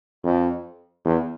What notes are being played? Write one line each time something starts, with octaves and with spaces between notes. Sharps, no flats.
F2
E2